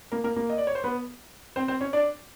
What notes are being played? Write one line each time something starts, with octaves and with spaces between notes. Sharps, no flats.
A#3 A#4
A#3 A#4
A#3 A#4
D#5
D5
C#5
C5
B3 B4
C4 C5
C4 C5
C#4 C#5
D4 D5